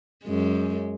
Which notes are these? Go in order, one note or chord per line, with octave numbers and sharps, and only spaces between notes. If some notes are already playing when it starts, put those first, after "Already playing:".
F#2 G#3